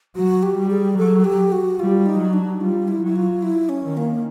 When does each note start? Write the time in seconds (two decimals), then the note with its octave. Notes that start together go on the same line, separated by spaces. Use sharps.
0.16 F#3 F#4
0.43 G4
0.57 G3
0.70 G#4
0.98 F#3 A4
1.24 G4
1.52 F#4
1.79 G3 F4
2.06 D#4
2.19 F#3
2.33 D4
2.61 G3 F4
2.88 E4
3.02 F#3 E4
3.16 F4
3.42 E4
3.69 C#4
3.83 D#3
3.97 A#3